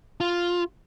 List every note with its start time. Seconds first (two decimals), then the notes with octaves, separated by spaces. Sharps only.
0.21 F4